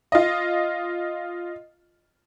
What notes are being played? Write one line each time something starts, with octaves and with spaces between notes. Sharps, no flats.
F4 D#5